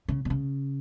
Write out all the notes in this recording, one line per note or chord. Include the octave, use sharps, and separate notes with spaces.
C#3
B2
C#3